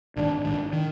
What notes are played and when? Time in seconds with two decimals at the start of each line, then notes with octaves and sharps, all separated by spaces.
0.16 A#1 G#2 D#3 D4
0.44 A#1 G#2 D#3 D4
0.73 D#3